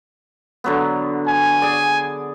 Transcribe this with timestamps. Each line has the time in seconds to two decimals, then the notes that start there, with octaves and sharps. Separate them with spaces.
0.64 D3 F#3 B3
1.25 G#5
1.62 G#4 D5